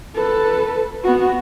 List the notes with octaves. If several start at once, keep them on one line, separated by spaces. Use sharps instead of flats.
A4 B4
B3 F#4